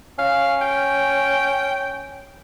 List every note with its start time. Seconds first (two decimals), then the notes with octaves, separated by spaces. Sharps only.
0.18 C#4 F5
0.61 G5